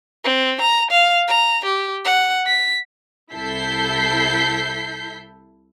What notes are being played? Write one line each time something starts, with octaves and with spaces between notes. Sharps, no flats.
C4
A#5
F5
A#5
G4
F#5
B6
C2 E4 A4 G6 B6 C7